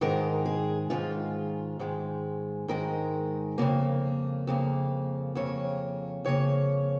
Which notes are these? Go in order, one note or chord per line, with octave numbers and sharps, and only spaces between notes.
G#2 D#3 G#3 A#4
G#4
G#2 D#3 G#3 F4
G#2 D#3 G#3
G#2 D#3 G#3 A#4
F2 C#3 A#3
F2 C#3 A#3
F2 C#3 A#3 C#5
F2 C#3 A#3 C#5